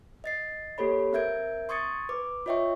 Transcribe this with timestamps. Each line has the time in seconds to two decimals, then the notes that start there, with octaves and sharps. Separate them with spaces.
0.24 D#5 A6 C7
0.78 A#3 G4 A4 C#5 B5
1.13 C4 A#4 E5 G6 G#6 D7
1.69 C6 C#6 D#6 G#6 A6 C#7
2.09 B4 D6
2.46 F4 C#5 D#5 E5 G5 C#6